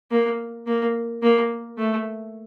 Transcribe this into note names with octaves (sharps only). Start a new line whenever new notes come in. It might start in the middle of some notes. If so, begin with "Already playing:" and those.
A#3
A#3
A#3
A3